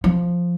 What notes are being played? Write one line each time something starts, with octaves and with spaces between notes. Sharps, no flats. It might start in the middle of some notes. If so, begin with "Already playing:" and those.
F3